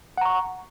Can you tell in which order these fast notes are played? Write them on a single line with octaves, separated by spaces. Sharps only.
F#5 A#5 C#6